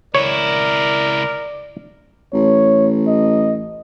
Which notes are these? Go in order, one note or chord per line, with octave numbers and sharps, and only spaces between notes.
C#2 E4 A#4 C#5 D5
A1 C#5
D#5